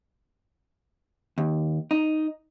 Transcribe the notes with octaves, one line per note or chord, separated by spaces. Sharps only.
D#2
D#4